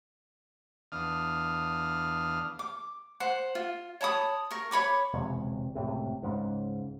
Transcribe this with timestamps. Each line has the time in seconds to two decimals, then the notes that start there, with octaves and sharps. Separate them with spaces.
0.92 E2 D4 F5 D#6 F6
2.59 D6
3.20 C5 F#5
3.55 F4
4.01 C#5 A5 B5 D#6
4.51 A#4 C#6
4.71 C#5 B5 C#6 D6
5.14 E1 C#2 C3
5.75 F#1 C#2 A2 C3
6.22 C#2 G#2 C#3